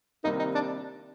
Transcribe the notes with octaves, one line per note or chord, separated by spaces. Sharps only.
C2 C3 D#3 G3 A#3 D#4
D#4
D4